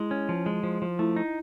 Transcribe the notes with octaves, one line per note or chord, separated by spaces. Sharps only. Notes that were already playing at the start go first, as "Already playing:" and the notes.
Already playing: G#3 E4
C#4
F3
G#3
F3
F3
A3 E4
D#4